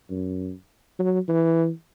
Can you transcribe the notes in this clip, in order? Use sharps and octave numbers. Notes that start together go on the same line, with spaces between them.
F#2
F#3
E3